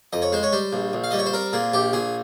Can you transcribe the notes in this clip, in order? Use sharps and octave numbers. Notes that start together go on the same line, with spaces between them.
F2 D#5
C#5
G#3 C5
C#5
G3 C5
A#1
A#1
F5
G3 D#5
C#5
C5
C4 A#4
A#2 G#4
A#1 G4
A#1 G#4